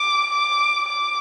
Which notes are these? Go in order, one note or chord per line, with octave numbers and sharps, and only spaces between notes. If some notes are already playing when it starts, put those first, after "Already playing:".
Already playing: D6
D6
D6